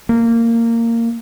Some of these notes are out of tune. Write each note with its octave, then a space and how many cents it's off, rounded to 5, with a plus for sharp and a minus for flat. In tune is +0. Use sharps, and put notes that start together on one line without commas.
A#3 -15